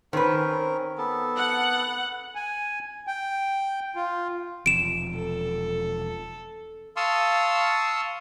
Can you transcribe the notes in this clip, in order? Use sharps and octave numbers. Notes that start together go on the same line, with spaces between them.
D#3 C4 C#4 A#4 B4
B3 A4
F#5
G#5
G5
F4
E1 C3 F3 D7 E7
A4
F5 A5 C6 C#6 D#6 E6